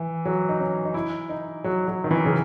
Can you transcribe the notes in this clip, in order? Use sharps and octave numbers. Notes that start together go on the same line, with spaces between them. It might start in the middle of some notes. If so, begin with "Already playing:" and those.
Already playing: E3
F#3
D#4
C#4
D#4
E4
D#4
F#3
F#3
D#3
E3
C#3